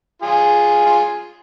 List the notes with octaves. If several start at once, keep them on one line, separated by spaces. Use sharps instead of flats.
F4 G#4
F4